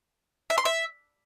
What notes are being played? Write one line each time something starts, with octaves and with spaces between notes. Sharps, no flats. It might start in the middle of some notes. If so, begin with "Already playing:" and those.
E5
C6
E5